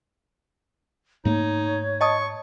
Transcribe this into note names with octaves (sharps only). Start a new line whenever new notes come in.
G#2 A3 A#3 D#4 C#5
D#5 A5 C#6 D#6